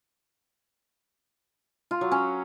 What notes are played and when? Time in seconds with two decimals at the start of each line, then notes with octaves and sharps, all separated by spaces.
1.91 F4
2.01 F#3
2.11 C#4